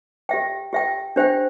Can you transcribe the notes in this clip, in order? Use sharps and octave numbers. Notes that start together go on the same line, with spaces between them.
G4 E5 G5
G4 E5 G5
D4 G4 C5 E5 G5